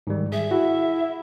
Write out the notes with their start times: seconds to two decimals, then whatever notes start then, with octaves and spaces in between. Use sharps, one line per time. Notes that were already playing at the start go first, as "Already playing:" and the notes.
0.07 G#2 D#3 G3
0.32 G#4 E5
0.51 E4 F#4